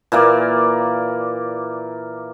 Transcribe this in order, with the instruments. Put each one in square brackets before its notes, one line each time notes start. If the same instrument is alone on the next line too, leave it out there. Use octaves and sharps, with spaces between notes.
[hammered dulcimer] A#2 E3 A#3 D5